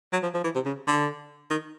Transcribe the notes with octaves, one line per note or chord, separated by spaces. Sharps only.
F#3
F3
F3
E3
C3
C#3
D3
D#3